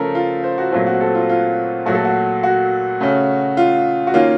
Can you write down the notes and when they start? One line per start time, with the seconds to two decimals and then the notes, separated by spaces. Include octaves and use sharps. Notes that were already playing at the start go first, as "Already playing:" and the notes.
Already playing: C#3 F3 A3 C#4 A4 A#4
0.15 F4
0.44 C5
0.58 F#4
0.72 A#2 F#3 A3 C4 F4
0.87 F#4
1.01 A4
1.15 F4
1.29 F4
1.86 A#2 F#3 A3 F#4
1.95 A4
2.05 F#4
2.43 F#4
3.00 C#3 A3 C#4
3.57 F4
4.07 F#4
4.14 D#3 A#3 C#4 F4